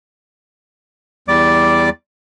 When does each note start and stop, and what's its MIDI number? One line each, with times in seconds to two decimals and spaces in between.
1.28 1.90 40
1.28 1.90 55
1.28 1.90 74
1.28 1.90 86